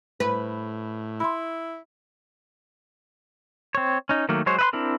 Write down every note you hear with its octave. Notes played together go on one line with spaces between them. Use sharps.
A2 B4
E4 B5 C6
C4 C#5
C#4 D#4
D#3 F#3 A3 A#3
F#3 G#3 C5 C#5
B4 E5 C6
C4 D4 E4 A#4